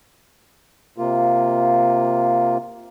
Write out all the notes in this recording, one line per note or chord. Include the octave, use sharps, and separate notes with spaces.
C3 A#3 F4